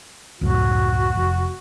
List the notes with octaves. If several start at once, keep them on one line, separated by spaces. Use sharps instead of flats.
C#2 F#2 A2 F#4
F1